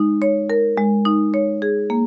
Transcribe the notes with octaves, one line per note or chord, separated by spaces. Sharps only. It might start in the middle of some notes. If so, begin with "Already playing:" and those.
Already playing: G#3 D#4
C#5
A#4
G#3
D#4
C#5
G#4
A#3